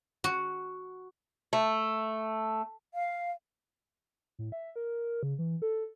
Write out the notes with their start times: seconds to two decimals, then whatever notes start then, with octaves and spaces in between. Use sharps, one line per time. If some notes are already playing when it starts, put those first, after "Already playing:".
0.24 F#4
1.53 A3
2.94 F5
4.39 A2
4.52 E5
4.76 A#4
5.23 C#3
5.39 E3
5.62 A4